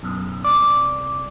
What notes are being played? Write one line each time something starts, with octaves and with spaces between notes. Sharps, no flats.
B1 F#2
C2 D5